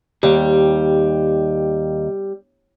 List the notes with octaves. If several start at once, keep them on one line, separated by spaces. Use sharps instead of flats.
D#2 G3